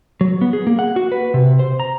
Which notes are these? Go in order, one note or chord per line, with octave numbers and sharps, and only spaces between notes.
F#3
B3
G#4
A#3
F#5
F#4
B4
C3
C5
A#5